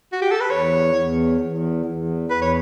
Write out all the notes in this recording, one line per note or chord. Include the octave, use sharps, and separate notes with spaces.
F#4
G4
A4
B4
E2 C#5
E2
E2
E2
E2 B4
C#5